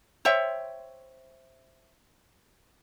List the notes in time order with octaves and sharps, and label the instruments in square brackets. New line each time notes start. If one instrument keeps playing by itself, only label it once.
[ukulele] C5 C#5 E5 G5